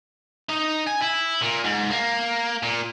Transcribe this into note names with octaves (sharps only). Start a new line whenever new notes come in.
D#4
G#5
E4
A#2
G#2
A#3
A#2